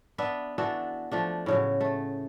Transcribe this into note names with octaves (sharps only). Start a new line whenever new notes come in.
B3 D4 E5
E3 D4 F#4 A4
F3 A3 D4
A2 C#3 F#3
A3